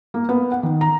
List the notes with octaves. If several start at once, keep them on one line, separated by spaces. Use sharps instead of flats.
A#3
B3
F#5
D#3
A#5